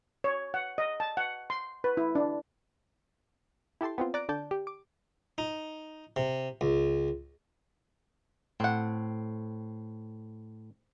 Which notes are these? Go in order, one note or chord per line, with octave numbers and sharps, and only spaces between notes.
C#5
F#5
D#5
A5
F#5
C6
B4
E4
D4
E4 G4 A4 A5 C6
B3 C4 F4
D5 A#5 F#6 D7
D3 D5 A5 G6
G4
D6
D#4
C3
C#2
A2 C4 F#5